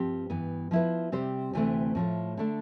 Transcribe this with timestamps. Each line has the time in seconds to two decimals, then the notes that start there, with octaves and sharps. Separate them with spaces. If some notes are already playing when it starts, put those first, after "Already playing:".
Already playing: G2 F3 C4 G4
0.30 G2 E3 B3
0.71 F3 B3 E4 B4
1.12 C3 G3 C4 G4 C5
1.53 D2 C3 E3 A3 C4
1.95 A2 F3 A3
2.37 D3 A3 D4